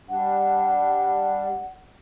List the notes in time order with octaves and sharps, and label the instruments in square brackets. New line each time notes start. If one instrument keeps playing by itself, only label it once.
[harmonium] G3 D4 [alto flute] F#5